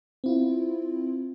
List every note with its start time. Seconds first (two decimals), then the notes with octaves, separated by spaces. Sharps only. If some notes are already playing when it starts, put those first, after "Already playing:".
0.24 C4 E4 F4